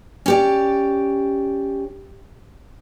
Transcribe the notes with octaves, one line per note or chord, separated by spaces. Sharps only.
C#4 G4 D5